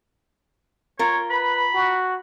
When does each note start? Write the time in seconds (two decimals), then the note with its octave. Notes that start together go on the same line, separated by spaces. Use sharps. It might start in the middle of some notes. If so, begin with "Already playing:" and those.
0.99 F4 A#4 C#5
1.30 B4 B5
1.74 F#4